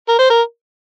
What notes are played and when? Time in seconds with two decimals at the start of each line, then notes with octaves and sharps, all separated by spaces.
0.09 A#4
0.19 C5
0.30 A#4